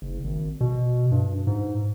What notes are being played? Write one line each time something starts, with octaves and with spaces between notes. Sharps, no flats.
F#1
G#1
B2
G2
G#2